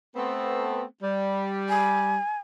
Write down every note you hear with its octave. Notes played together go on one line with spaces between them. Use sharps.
A3 B3 C4
G3
G#5